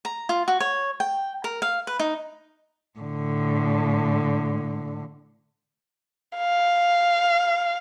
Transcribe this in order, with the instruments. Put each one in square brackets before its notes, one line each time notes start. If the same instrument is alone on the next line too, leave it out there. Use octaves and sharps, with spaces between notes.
[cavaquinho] A#5
F4
F#4
C#5
G5
A#4
F5
B4
D#4
[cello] A2 D3
[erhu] F5